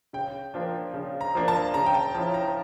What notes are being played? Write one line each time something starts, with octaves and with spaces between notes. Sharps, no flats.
C#3 G5
F3 A#3 D4
C#3
A#5
F3 A#3 D4
A5
C#3 A#5
G5
A5
F3 C#4 E4 A5
A#5